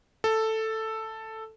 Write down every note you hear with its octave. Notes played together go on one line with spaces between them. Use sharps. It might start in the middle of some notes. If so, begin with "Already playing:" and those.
A4